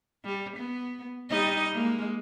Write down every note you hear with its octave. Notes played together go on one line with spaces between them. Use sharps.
G3
B3
G3 D#4 D#5
G#3 A#3